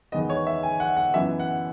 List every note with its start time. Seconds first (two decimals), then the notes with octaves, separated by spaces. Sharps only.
0.12 E2 D#3 G#3 B3 D#5
0.30 C#5
0.47 E5
0.63 G#5
0.80 F#5
0.97 F#5
1.14 F#2 E3 B3 E5
1.39 F#5